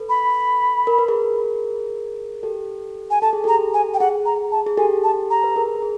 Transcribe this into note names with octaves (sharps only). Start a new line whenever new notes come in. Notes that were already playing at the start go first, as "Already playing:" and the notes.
Already playing: A4 B4
B5
A#4
B4
G#4 A#4
G4 A4
G#5
A4 A5
G#4
G4 A4 A#5
G#5
G5
G#4 F#5
A#5
A5
G#4
G4 A4 G#5
A5
A#5
B4
G#4 A#4
G#4